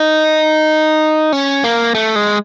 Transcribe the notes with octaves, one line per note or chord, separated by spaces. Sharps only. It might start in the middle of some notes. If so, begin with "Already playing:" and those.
Already playing: D#4
C#4
A#3
A3
G#3